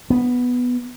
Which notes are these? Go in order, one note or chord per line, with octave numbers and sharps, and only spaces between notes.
B3